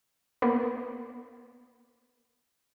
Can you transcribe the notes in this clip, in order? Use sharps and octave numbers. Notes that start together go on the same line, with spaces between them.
A#3 B3